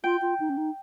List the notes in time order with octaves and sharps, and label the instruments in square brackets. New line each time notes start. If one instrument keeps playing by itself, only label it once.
[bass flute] F4 [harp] G5
[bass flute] F4
D#4
C#4
D#4